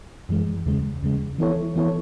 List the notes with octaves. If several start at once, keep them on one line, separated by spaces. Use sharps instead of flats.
F#2 E3 G#3
E2 C#3 G#3
E2 C#3 G#3
E3 B3 E4 A4 C#5
E3 B3 E4 A4 C#5